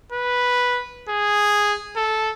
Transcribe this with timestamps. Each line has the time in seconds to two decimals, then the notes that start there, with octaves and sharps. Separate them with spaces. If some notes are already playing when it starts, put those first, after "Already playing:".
0.12 B4
1.09 G#4
1.97 A4